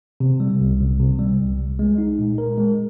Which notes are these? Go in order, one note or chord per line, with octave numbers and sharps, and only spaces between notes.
C3
G3
C2
C2
C3
G3
C2
C2
G#3
D#4
A#2
A#4
G#3